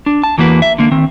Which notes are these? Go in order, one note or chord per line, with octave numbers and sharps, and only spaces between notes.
D4
A5
E2 E3 A#3 F#4 B4
E5
D3 A#3
D#3 C4